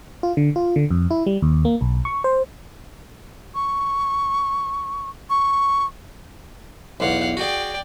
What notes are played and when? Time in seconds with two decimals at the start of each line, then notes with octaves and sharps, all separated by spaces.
0.23 F4
0.37 D3
0.56 F4
0.76 D3
0.91 F2
1.11 E4
1.27 G3
1.42 D#2
1.65 A#3
1.81 B1
2.05 C#6
2.24 C5
3.55 C#6
5.30 C#6
7.00 B1 E2 F5 F#5
7.37 F#4 G#4 D5 G5